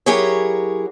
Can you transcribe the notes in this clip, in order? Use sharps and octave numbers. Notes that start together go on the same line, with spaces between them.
F#3 E4 G4 G#4 A#4 C#5